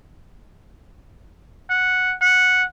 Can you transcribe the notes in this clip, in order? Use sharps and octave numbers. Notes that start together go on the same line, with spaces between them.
F#5
F#5